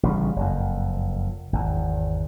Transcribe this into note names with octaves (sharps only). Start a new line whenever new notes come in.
A1 C#3 G3
F#1 F2
G#1 E2